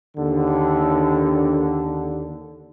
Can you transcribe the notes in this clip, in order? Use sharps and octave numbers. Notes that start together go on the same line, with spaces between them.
D#2 D3